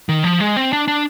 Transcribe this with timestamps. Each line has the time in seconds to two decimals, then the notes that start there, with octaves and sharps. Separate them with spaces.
0.09 D#3
0.24 F3
0.40 G#3
0.56 C4
0.73 D4
0.88 D4